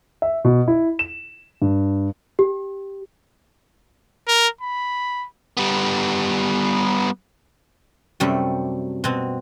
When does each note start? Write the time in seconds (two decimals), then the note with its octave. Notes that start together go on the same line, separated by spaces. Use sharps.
0.22 E5
0.45 B2
0.68 E4
0.99 E7
1.62 G2
2.39 G4
4.28 A#4
4.61 B5
5.57 G3 B3
8.20 F#2 C3 G3 A3
9.04 B2 C4